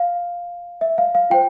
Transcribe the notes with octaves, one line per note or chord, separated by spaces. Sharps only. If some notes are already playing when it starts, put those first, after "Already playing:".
Already playing: F5
E5
F5
F5
F4 C5 G5